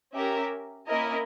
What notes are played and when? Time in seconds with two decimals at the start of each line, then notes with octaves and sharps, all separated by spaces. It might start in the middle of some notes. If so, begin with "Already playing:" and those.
0.14 C#4 G4 A#4 E5
0.88 A#3 C#4 E4 A#4 D#5